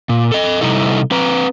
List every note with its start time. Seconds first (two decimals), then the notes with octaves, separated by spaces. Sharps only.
0.09 A#2
0.32 A4 D#5
0.61 C3 G3 D#4 E4 A4
1.11 C4 B4 A#5